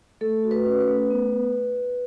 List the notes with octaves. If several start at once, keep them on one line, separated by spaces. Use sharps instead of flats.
A3 A4
F#4
B4
C#4
B4
A3
B3